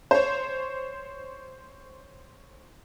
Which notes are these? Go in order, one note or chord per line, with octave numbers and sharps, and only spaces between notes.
C5 C#5